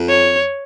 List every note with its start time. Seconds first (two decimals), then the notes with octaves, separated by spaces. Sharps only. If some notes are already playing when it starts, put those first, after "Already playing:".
Already playing: F2
0.09 C#5